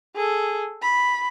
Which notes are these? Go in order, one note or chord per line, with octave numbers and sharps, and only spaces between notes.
G#4 A4
B5